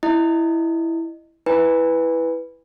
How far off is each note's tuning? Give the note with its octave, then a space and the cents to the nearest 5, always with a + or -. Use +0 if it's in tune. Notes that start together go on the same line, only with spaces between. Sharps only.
E4 +0 D#5 -15
E4 +0 B4 +0 G#5 -25